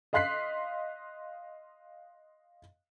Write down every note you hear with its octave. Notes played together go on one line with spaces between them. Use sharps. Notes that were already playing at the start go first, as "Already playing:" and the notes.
D#5 F5 C6 F#6 B6 C7